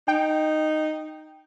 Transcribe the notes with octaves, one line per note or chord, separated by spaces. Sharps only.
D#4 G5